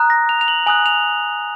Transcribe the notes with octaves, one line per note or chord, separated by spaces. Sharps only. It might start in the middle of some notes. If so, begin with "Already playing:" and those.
Already playing: A#5 D#6 F#6
A#6
F7
F7
F#7
G#5 D#6 F#6 F#7
F7